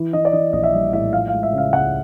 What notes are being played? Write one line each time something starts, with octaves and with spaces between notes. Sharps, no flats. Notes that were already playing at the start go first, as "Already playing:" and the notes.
Already playing: E3
E3 D#5
D5
E3 D#5
A#1 D#5
E5
G3 D#5
A2 E5
F3 F5
F5
G#3
E5
C#3
F5
C#2 F#5